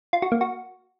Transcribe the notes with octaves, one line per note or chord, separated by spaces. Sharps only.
F4
F#4
A#3
F#4